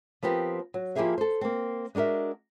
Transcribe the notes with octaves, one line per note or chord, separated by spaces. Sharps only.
F3 B3 C4 G4 A#4
F#3
F3 A#3 E4 G4 G#4 E5
A4 C5
A#3 C4
G#3 D4 F#4 A#4 E5